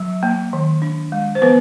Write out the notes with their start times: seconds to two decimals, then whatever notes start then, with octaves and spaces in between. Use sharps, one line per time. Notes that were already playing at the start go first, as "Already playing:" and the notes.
Already playing: F#3
0.23 A#3
0.53 D#3
0.82 D4
1.12 G#3
1.35 C5
1.42 F3 B3 B4